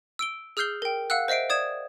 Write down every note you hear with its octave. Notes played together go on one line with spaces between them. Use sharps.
E6 D7 G7
G#4 E6 F6 G6 C7 G7
A#4 G5
F5 F#5 E6 F#6
C5 D#5 E5 C7 D7
D5 D#6 G#6 E7